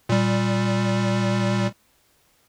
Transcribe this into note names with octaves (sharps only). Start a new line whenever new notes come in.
A#2 G3